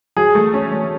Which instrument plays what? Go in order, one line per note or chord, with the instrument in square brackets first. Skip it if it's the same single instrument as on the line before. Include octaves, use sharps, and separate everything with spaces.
[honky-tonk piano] F#3 [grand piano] G#4
[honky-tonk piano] A3
C#4
A3